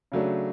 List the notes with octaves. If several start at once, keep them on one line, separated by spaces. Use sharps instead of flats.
C#3 F#3 A3 D4